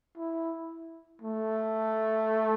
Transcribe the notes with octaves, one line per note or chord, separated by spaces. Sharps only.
E4
A3